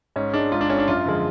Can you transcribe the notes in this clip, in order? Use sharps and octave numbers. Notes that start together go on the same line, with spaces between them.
G#2 C#4
G#3 D4
G#2 F4
D4
G#3 C#4
D4
F#2 F4
D3 F3 G#3